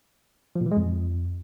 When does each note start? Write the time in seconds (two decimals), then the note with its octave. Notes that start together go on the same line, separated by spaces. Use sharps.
0.56 F3
0.61 A#2
0.66 E3
0.71 G#3
0.77 F2